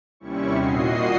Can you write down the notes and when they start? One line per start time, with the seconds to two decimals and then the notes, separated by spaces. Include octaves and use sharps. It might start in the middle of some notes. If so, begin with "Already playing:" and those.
0.20 D#2 C3 G3 C#4 E4 C#6
0.54 A#2 F#4 D#5 C7